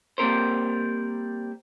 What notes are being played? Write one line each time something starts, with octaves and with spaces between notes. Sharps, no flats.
G3 A#3 C4 A#4 C5